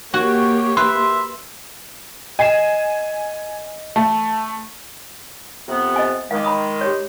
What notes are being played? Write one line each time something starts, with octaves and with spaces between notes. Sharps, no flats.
A#3 F#4 G4 C#5
B4 E5 C6
D#5 G#5 C7 E7
A3 A5
F2 C3 B3
D#5 G#5
D#3 G#3 F5 D6
A#5 B5 D#6
G4 G#4 C#5